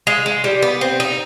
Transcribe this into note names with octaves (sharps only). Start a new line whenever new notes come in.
G#3
G#3
G3
B3
C4
D#4